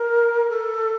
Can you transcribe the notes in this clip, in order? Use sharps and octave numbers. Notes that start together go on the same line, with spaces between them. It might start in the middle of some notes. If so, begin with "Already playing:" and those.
Already playing: A#4
A4